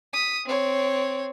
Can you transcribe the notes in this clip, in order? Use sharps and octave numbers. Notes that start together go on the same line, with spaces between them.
D#6 B6
C4 C#5